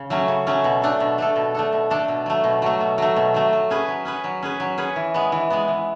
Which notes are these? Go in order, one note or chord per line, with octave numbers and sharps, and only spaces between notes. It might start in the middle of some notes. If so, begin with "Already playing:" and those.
Already playing: C#3
F#3 A3 C#4
C#3
F#3 A3 C#4
B2
A3 D4 A4
B2
A3 D4 A4
B2
A3 D4 A4
B2
A3 D4 A4
B2
F#3 A3
B2
F#3 A3
B2
F#3 A3
B2
F#3 A3
F#3
C#4 G#4 B4
F#3
C#4 G#4 B4
F#3
C#4 G#4 B4
F#3
C#4 G#4 B4
E3
G#3 B3
E3
G#3 B3
E3